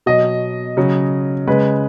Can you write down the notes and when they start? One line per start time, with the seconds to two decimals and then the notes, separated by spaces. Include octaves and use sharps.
0.06 B2 F#3 D#5
0.77 C#3 F#3
1.47 C#3 G#3 B4